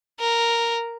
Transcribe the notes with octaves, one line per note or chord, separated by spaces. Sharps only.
A#4